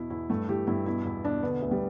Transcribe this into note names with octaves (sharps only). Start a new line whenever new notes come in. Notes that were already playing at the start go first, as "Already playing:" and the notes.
Already playing: E2 B2 E4
E2 E4
G2 A3
E3 G4
G2 E4
B2 E4
E2 E4
B2 D4
D3 B3
D2
G3